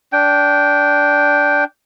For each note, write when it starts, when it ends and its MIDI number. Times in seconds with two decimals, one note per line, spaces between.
0.13 1.64 62
0.13 1.64 79